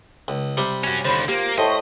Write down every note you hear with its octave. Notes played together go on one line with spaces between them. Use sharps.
C#2
C3 G3
C#4 F#4
D#2 D3 C5 C#5 B5
A#3 F4 G4 C5
A2 C5 D#5 E5 A5 C#6